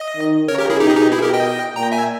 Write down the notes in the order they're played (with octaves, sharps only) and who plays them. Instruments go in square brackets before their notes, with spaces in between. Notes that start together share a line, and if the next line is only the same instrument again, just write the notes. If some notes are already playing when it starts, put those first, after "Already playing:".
Already playing: [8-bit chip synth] D#5
[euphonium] D#3
[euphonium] C#3 [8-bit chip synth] A#4 C#5
[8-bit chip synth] G4 A#4
E4 G#4
[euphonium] B2 [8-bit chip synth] D#4 G4
[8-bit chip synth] G#4
D#4 G4
E4 G#4
G4 A#4
D#5 G5
[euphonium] A#2 [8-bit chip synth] G5 A#5
[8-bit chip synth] E5 G#5